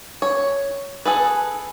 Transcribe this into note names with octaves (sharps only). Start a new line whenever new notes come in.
C#5
G#4 A4 B4